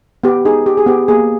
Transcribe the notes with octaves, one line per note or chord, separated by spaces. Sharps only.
B3 G4
D#4 G#4
G4
G#4
B3 G4
A#3 G#4